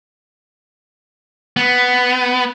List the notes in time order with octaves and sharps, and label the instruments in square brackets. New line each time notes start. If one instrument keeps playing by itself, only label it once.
[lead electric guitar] B3